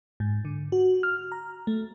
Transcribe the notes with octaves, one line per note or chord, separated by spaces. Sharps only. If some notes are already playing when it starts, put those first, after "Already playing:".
G#2
D3
F#4
F6
A#5
A3